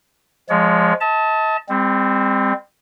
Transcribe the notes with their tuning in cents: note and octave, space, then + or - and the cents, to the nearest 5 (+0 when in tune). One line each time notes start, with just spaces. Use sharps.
F3 +0 G#3 +0 C#5 +30
D#5 +45 A5 +0
G3 +40 C4 -5